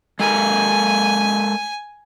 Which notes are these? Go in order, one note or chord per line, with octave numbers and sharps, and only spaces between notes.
G#3 A4 A#4 G#5